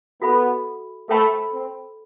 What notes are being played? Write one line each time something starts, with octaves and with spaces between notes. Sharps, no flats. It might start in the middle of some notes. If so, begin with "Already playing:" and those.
B3 F#4 A4 E5 B5
A3 A4 C5 E5 G5 B5
C4